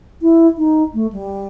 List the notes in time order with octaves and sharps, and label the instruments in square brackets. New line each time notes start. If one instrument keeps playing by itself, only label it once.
[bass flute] E4
D#4
A3
G3